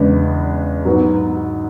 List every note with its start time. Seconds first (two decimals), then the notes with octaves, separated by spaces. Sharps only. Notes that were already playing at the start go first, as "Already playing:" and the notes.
Already playing: E2 C#3 G#3 B3 D4
0.85 G#2 F#3 B3